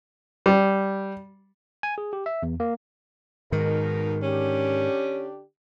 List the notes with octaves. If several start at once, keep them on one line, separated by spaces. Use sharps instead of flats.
G3
G#5
G#4
G4
E5
E2
A#3
G#2 B2 D#3 D#4 A#4
D3 C#4 D4 G4